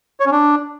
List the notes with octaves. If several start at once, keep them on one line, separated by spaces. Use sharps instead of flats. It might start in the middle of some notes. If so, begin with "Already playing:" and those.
C#5
C#4
D4